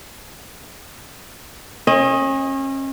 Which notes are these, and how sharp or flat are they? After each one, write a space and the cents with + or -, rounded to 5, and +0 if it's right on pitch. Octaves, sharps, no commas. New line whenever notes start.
C#4 -35 D#5 +15